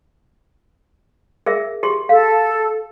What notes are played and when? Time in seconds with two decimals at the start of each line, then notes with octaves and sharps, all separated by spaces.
1.46 G#4 A#4 E5
1.83 G4 G#4 C6
2.09 A4 F5